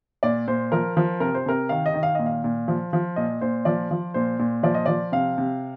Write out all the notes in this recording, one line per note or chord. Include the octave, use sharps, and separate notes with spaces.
A#2 D5
A#2 C5
F3 A#4
F3
C3 A#4
C5
C3 A#4
D#3 F5
D#5
D#3
F5
A#2 D#5
F5
A#2
F3
F3
A#2 D#5
A#2 C5
F3 D5
F3
A#2 C5
A#2
F3 D5
D#5
F3 D5
C3 F5
C3